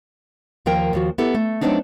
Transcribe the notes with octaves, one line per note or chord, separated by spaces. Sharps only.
D#2 F3 A#3 A#4 G5
D#2 F3 F#4
B3 E4 G4 A4
A3
F#3 A3 B3 C4 D4 D#4